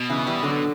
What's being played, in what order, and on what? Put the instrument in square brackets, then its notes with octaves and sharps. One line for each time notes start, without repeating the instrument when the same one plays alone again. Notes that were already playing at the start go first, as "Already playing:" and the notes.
Already playing: [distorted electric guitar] B2
[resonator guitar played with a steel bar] C#3 E3
E3 G3
D3 F#3